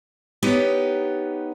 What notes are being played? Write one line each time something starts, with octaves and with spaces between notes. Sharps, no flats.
B3 D#4 G4 B4 C#5